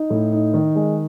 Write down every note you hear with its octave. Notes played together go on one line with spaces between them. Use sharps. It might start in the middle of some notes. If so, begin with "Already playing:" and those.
Already playing: D#4
A2
D#4
D#3
G#3